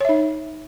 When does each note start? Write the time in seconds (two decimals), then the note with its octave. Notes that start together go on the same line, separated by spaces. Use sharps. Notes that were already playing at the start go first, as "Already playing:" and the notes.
0.01 C#5
0.05 E5
0.09 D#4